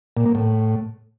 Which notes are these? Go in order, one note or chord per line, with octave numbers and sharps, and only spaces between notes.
A#2
A#3
A2